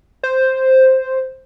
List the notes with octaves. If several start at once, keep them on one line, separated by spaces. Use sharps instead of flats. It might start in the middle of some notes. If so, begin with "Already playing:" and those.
C5